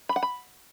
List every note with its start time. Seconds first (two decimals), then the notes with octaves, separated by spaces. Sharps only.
0.09 B5
0.16 F#5
0.23 B5